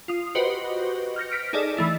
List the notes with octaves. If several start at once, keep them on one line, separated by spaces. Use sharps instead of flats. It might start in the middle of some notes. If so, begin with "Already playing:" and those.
F4 D#6
F#4 G4 B4 C5 D#5
F6 G6 A#6 C#7
F6 B6 D7
D#4 G#4 A4 D5 D#5
E3 A3 E4